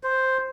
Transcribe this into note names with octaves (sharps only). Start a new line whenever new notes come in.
C5